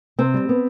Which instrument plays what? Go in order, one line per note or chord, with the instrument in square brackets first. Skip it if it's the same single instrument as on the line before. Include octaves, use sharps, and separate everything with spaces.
[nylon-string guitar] C3 C4
G3
B3